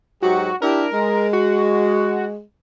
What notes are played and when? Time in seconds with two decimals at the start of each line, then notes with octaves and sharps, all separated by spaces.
0.22 G#2 F#3 F#4 G4
0.62 D4 E4 G4 A#4
0.93 G#3
1.33 F#4